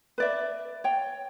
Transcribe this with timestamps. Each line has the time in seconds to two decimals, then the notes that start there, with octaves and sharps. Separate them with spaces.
0.18 B4 D5 E5
0.84 C#5 G5